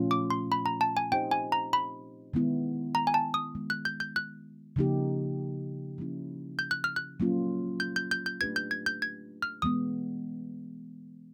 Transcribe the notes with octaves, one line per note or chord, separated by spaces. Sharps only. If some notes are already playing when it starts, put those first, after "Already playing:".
Already playing: A#2 F3 A3 C#4 F4
D6
C6
B5
A#5
A5
G#5
C4 D#4 G4 C5 D#5 G5
G#5
A#5
B5
D#3 G#3 B3 E4
A#5
G#5
A5
D#6
D#3 G#3 B3
F#6
G6
G6
F#6
C#3 F3 A#3 D#4 G4
F3 A#3 C#4 E4
G6
F#6
F6
F#6
F#3 A#3 C#4 F4
G6
G6
G6
G6
A3 D4 G4 B4 G#6
G6
G#6
G6
G#6
F6
E3 G#3 B3 D#6